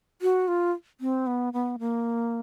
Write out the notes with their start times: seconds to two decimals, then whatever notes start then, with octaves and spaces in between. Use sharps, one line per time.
0.22 F#4
0.48 F4
1.01 C4
1.27 B3
1.53 B3
1.79 A#3